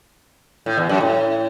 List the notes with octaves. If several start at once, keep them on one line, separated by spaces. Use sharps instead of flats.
A2
E2
F#2
A2